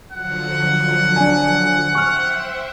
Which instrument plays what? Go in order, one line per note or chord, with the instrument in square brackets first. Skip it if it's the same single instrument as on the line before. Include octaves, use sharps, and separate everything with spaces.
[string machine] D3 F3 F#3 [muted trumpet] F#5
[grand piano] D4 G#5
[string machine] C5 E5 G5 [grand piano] C#6 F6